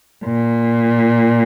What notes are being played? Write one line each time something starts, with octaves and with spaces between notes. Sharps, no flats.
A#2